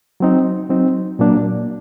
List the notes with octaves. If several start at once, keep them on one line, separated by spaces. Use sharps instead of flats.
F#3 C4 D#4
F#3 C4 D#4
A#2 F#3 A#3 D4